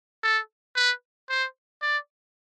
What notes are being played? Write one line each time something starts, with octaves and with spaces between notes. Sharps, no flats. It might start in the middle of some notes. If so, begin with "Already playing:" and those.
A4
B4
C5
D5